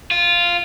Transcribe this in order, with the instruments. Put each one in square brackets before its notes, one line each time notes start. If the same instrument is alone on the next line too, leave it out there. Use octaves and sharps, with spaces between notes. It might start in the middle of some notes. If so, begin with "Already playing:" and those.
[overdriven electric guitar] F4